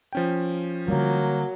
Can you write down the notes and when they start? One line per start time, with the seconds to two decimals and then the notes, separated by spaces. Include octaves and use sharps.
0.13 F3 C#4 G5
0.88 D3 F#3 G3 A#3